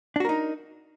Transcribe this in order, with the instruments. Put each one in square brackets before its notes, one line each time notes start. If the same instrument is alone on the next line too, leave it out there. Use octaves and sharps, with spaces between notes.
[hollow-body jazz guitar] D4
F#4
A#4
D#4